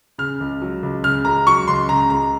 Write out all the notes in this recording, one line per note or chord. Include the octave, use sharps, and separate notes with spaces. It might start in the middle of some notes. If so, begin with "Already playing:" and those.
C#3 F6
C#2
F#3
C#2
C#3 F6
C#2 A#5
F#3 C#6
C#2 C6
C#3 A#5
C#2 A#5